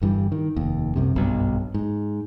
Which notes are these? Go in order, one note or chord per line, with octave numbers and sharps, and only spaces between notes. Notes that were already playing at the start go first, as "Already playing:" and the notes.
G1 G2 E3 G3
D#3
F1 D#2
C2 F#2 C3
F#1 B1 G2 B2
G#2